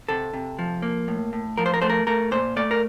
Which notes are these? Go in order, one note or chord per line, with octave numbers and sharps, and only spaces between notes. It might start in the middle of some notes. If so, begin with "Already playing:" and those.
C3 A4
C3
F3
A#3
A2
A2
F3 A#4
C5
A#4
A3 C5
A#4
A3 A#4
A#2 C5
A3 D5
A#4